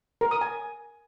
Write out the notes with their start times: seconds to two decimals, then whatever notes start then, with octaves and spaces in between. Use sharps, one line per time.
0.21 A#4
0.31 D#6
0.41 G#5